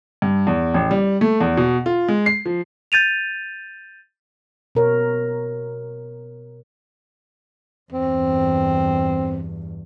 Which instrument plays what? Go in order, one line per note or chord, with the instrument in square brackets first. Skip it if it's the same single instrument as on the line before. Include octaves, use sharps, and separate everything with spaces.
[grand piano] G2
E2
A1
G3
A3
E2
B2
F4
G#3
C7
F3
[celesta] G6 A6 D#7 F7
[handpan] B2 A#4 C#5
[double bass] E2 G2 [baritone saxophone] C4